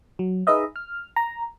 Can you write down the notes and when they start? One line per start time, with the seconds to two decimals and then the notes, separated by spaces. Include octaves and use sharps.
0.19 F#3
0.47 D#4 G#4 B4 D#5 E5
0.76 F6
1.16 A#5